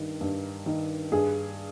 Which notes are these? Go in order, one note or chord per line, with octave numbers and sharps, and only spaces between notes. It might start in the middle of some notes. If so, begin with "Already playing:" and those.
Already playing: G2 D#3
G2
D#3
G2 G#4